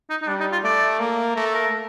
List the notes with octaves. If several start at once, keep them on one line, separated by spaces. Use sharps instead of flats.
D#4
D#4
G3 D4
D#4
F4
A3 D5
A#3
A3 A#4
A4
A#4